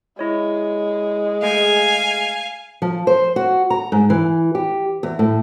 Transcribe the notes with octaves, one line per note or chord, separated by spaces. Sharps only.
G#3 E4 C#5
A3 G#4 F5 G#5 G#6
F3
C5
F#4
A#5
G#2
E3
G4
E2
A2